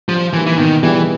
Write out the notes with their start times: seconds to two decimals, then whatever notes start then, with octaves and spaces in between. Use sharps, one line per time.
0.08 F3 G3
0.33 E3 A#3 D#4 G4
0.46 E3
0.58 B2 D#3
0.83 E3 G3 B3 E4 G#4